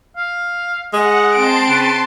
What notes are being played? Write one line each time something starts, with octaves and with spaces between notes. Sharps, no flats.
F5
G#3 D#5 F#5
C4 A5 C6 D7
C#3 B4